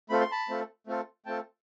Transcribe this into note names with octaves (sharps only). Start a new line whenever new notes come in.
A3 C4 F4 A4 B5
C6
A5 B5
A3 C4 F4 A4
A3 C4 F4 A4
A3 C4 F4 A4 G5 A5